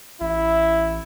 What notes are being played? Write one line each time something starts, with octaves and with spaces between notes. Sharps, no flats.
A1 E4